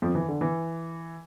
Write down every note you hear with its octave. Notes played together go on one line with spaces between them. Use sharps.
F2 F3
E3
D3
E3